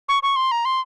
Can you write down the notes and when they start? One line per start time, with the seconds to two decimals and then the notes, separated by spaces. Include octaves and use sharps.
0.09 C#6
0.23 C#6
0.36 C6
0.52 A#5
0.65 C6